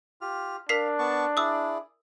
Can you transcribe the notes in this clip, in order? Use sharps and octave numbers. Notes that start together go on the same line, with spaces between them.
F4 G4 F6
D4 A#4 F5 B6 C7
B3 A5 C#6
E4 G#4 D5 D#6 E6